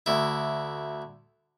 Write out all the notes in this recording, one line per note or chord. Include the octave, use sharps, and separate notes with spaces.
D2 E4